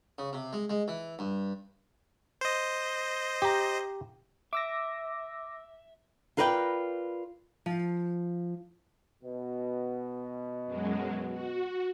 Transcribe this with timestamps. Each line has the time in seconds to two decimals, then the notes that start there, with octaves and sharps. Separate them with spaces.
0.18 C#3
0.33 C3
0.53 G#3
0.70 G#3
0.88 E3
1.19 G2
2.41 C5 D#5
3.42 G4 A#5
4.53 E5 D6 E6 A#6
6.37 F4 A#4 B4 D5 D#5 G5
7.66 F3
9.22 B2
10.66 F#2 F#3 G#3
11.31 F#4